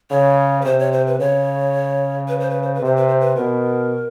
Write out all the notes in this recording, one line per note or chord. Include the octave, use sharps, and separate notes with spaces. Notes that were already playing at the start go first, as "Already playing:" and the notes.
C#3 C#5
B4
C3 C5
C#5
C5
B4
C#3 C#5
B4
C5
B4
C5
B4
C3 C5
B4
C5
B4
B2 A#4